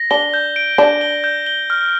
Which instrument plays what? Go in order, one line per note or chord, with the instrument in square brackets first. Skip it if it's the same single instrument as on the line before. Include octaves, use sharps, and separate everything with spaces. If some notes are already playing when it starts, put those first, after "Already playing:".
Already playing: [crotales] A#6
[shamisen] D4 [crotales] G7
[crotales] G6
D7
[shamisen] D4 [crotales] G6
[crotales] G7
G6
G7
F6